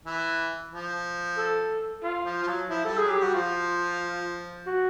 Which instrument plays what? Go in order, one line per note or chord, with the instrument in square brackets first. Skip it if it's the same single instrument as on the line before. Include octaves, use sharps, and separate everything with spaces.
[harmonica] E3
F3
[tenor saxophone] A4
F4
[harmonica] F3
F3
F#3
[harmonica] F3 [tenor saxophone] E4
[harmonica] G3 [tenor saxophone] A4
[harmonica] F#3 [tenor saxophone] G#4
[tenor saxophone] G4
[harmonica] G3 [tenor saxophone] F#4
[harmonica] F3 [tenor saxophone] F4
[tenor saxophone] F#4